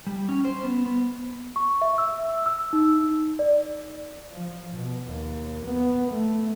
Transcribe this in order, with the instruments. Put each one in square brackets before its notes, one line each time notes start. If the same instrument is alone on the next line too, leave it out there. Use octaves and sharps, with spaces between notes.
[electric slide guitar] G3
C#4
C5
B3
B3
[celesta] C#6
E5
E6
E6
D#4
D5
[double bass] F3
B2
D#2
B3
A3